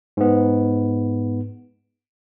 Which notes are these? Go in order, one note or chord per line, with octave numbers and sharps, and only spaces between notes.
G#2 B3